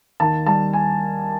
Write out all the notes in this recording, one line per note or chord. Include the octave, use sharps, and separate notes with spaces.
D#2 A5
G3 A5
G#5